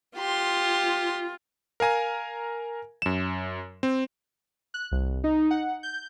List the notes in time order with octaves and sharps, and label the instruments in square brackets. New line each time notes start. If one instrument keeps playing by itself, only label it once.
[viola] F4 [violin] G4 C6
[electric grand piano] A#4 F5 G#5 A#5
F#2 E7
C4
[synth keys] F#6
C2
D#4
F#5
G6